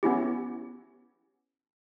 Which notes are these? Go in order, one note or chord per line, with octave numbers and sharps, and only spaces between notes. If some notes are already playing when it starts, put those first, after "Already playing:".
B3 C#4 E4 G4